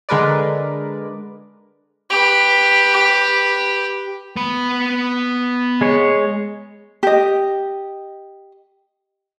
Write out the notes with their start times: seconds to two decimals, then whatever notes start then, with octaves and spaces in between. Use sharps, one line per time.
0.09 D3 G#3 A#4 B4 D5
2.10 G4 B4
4.36 B3 B5
5.81 G#3 G#4 C#5
7.03 G4 D#5